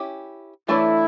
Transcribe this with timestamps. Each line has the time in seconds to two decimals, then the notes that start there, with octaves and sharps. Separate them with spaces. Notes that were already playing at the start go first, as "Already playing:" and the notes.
Already playing: C#4 E4 G4
0.68 E3 A3 D4 E4 A4 C#5